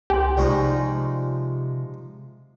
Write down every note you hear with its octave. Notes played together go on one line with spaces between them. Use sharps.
C2 G4 G#5 C6
C3 F3 G#3 D#4 D5 C#6